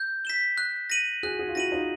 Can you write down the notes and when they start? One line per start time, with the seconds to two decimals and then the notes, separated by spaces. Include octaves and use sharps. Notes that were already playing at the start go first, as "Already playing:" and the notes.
Already playing: G6
0.25 B6 E7 G7
0.58 F#6
0.90 A#6 D#7 F#7
1.23 F#4 G#4 F#6
1.39 F#4 G#4
1.48 F4
1.55 E4 F#4 A#6 D#7 F#7
1.72 D#4 F4